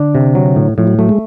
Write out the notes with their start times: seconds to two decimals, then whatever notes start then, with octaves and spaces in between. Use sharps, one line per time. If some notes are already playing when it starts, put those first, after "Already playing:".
Already playing: D3 D4
0.15 C3
0.35 F#3
0.56 A2
0.78 A2 F3
0.87 F#3
0.99 F#3 A3
1.09 G#3